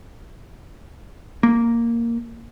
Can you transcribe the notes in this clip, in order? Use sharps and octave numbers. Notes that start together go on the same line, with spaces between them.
A#3